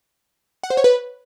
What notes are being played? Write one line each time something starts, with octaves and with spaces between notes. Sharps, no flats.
F#5
C5
C#5
B4